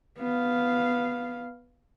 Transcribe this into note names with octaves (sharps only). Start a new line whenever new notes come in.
B3 F5